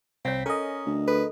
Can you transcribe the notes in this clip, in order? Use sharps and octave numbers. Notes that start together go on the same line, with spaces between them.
C2 C4 C#5 F5 B6
C#4 A4 A#4 D#5 G#5
D2
A4 B4